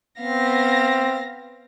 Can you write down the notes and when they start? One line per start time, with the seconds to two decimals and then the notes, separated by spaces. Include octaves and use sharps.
0.20 B3 C4 F5 A#6